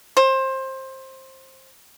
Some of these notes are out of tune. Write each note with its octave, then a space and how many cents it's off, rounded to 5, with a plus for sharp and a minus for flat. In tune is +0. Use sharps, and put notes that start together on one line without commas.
C5 +20